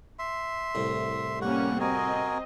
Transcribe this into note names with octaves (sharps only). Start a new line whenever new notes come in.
E5 C6
C2 A2
G3 A#3 C#4 F#5 C#6
C4 F#4 A#4 D#5 G#5